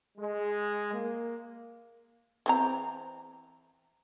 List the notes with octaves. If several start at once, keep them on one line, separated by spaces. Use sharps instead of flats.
G#3
A#3
E3 C4 A#5